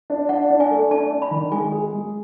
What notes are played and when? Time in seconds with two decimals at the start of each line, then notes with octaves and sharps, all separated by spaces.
0.10 D4
0.29 D4 F#5
0.50 D4
0.60 G#5
0.71 A3
0.91 D4 A5
1.12 D4
1.22 B5
1.31 D#3
1.51 G#3 G#5
1.72 G#4
1.93 G#3